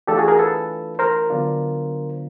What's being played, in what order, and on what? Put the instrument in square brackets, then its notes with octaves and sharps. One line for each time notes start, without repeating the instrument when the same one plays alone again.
[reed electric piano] E3 A3 D4 F4 G4 A4
F#4 G#4
G#4 A#4
A4 B4
A#4 C5
D3 F#3 B3 D4 F4